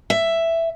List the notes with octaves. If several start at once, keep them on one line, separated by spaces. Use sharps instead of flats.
E5